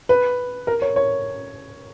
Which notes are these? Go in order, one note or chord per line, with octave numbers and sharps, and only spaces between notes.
B4
A#4
C#5
C#5